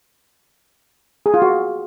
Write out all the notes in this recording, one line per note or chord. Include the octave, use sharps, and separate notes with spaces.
G#4
F4
F#4